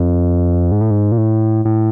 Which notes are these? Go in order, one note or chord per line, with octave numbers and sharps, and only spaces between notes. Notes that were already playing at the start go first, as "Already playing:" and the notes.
Already playing: F2
G#2
A2
G#2
A#2
A2
A2